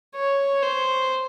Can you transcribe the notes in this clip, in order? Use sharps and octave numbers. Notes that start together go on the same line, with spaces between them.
C#5
C5